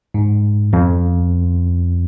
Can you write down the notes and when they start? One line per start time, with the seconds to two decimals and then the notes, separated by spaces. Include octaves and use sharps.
0.14 G#2
0.73 F2